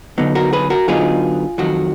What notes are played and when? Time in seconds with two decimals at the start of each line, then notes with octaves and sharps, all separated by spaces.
0.18 D3 F#3 B3 D#4
0.35 F#4 A#4
0.53 G#4 B4
0.70 F#4 A#4
0.88 D3 F#3 B3 D#4 F4 G#4
1.58 F2 D#3 F#3 F#4